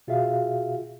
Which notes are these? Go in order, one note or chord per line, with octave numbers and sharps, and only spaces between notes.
B2 F4 F#4 G#4 E5 F5